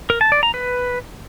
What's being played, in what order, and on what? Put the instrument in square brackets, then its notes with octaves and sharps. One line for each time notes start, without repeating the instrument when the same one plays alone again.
[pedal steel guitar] A#4
A5
D5
A#5
B4